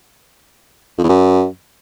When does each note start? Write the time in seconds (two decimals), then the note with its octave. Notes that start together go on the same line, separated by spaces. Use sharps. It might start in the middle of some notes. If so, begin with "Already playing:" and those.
0.98 F2
1.04 E2
1.09 F#2